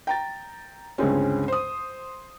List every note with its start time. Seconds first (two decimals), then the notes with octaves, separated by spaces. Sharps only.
0.07 G5 A#5 A6
0.98 C#2 G2 D3 G#3 C4 C#4
1.48 C5 D#6